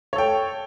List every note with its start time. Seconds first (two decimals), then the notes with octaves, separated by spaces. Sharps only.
0.13 C#5
0.16 A4
0.18 G5